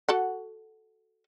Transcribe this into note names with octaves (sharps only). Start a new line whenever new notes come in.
F#4 A4 F#5